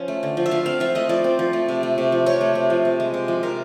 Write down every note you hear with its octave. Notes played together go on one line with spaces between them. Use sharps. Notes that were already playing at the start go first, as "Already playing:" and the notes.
Already playing: F3 C#4
A3
D3
F3
E5
F3 F5
C4 F5
F3 E5
A3 D#5
F3 D5
C4
F3
A3
C3
A3
C3
F3
C3 C#5
A3
C3
F3
C3
G#3
C3
F3
C3 A#4